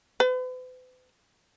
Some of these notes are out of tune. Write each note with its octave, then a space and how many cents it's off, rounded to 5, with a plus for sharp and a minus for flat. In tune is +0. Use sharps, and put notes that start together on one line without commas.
B4 +45